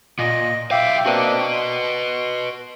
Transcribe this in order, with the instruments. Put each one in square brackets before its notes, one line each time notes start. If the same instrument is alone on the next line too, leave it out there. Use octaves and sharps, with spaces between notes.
[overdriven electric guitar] A#2 [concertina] D#5
[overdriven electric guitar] B1 F5 [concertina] E5 G5 D6
[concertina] A#3 C4 D4 [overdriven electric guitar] F#4 B4
[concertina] C6